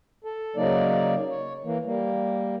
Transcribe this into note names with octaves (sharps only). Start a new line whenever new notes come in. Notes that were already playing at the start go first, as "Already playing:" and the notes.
A4
C#3 F#3 A#3 D#4 D5
C#5
E3 A#3
G3 A#3